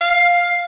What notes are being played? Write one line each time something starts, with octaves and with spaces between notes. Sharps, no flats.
F5